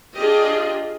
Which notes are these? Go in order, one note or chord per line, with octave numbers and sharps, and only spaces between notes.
D4 F4 G4 G#4 D#5